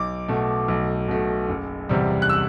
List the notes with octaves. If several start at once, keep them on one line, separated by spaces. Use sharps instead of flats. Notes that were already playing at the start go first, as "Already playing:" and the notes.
Already playing: B1 D6
B2 A3
B1
B2 A3
F#1
E2 C3 G3
F#6
E6